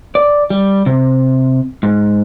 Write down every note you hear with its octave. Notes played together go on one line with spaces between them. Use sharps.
D5
G3
C3
G#2